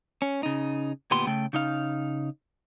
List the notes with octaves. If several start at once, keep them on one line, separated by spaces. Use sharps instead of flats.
C#4
C#3 D#4
D2 A#2 B3 G4 C6
C#3 A3 G5
C#3 D#4 F5